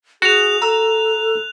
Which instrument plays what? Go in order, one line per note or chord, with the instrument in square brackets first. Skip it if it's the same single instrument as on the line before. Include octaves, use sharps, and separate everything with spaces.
[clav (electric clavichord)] F#4 [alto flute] G#4 [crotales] F#6 F7
[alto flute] A4 [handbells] A#5 E6